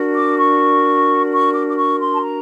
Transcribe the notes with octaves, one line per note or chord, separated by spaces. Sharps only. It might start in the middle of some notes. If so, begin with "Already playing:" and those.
Already playing: D4 F#4 A#4
D6
C#6
C#6
D6
D6
C#6
C6
A5
A#5